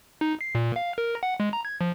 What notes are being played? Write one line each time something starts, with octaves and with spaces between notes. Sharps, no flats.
D#4
C7
A#2
F5
A#4
F#5
G#3
A#5
G#6
F3